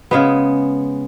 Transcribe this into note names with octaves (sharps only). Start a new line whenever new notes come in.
C#3 G#3 B3